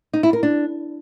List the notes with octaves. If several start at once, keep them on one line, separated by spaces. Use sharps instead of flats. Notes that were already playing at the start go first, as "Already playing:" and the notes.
D#4
E4
A#4
D4